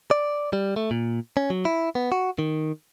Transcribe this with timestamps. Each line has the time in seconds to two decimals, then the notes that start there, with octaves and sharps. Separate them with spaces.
0.11 D5
0.53 G3
0.76 A3
0.91 A#2
1.37 C#4
1.50 F#3
1.65 E4
1.95 B3
2.12 F#4
2.39 D#3